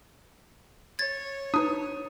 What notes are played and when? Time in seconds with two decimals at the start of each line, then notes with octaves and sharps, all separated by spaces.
0.99 C#5 G#6 A6
1.54 D4 D#4 B4 D#6